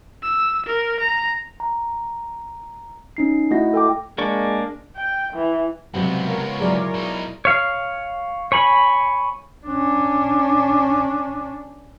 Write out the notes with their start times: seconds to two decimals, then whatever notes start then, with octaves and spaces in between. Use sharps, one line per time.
0.23 E6
0.66 A#4
1.00 A#5
1.60 A#5
3.17 C#4 D#4 C7
3.51 A3 E4 F#4 D#5 F#5 A#6
3.73 A4 G5 D6
4.18 G#3 A#3 D4 D5 C#6
4.96 G5
5.34 E3
5.94 C#2 C3 F#3 G3 B3 C4
6.25 F4 A#4 C#5
6.60 F#3 G#3 E4 G#4 D5 A#5
6.94 B2 D#4
7.45 C#5 F5
8.52 C#5 G#5 B5
9.67 C#4 D4